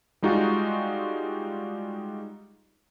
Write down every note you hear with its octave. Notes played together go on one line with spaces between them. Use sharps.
G3 G#3 D#4 F4 F#4